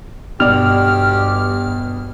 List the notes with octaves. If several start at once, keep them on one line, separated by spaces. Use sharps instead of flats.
G1 G2 B2 G4 D5 F6